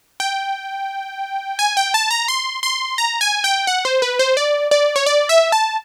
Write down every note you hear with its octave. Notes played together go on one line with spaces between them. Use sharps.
G5
G#5
G5
A5
A#5
C6
C6
A#5
G#5
G5
F#5
C5
B4
C5
D5
D5
C#5
D5
E5
A5